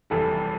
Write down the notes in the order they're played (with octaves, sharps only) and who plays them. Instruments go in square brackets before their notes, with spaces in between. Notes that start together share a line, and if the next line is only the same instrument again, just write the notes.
[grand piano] F#1 E2 C3 E3 G3 [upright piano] A4